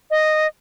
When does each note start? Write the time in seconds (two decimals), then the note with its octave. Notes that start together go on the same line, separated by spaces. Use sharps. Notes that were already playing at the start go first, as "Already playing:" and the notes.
0.10 D#5